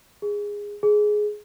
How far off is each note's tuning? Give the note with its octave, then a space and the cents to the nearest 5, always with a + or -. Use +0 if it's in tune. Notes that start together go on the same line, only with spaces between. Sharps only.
G#4 -15
G#4 +10